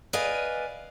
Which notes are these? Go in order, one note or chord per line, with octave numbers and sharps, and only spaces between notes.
B4 D5 D#5 F5 G#5